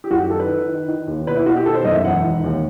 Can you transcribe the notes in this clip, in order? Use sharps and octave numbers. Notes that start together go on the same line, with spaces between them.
G4
F#2 F#4
G4
D#3 A4
B4
D#3
D#3
D#3
D#2
B2 B4
E4
B2 F#4
G4
D#3 A4
C5
F#2 D#5
E5
E1 F#5
D#3
D#2